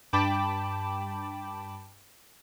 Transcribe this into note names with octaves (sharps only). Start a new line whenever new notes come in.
G2 G5 A5 B5 D6